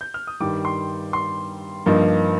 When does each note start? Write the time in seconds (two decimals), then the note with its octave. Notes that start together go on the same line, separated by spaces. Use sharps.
0.01 G6
0.14 F6
0.27 D#6
0.40 G2 D#3 G3 D6
0.65 C6
1.13 C6
1.86 G2 F3 A#3 D#4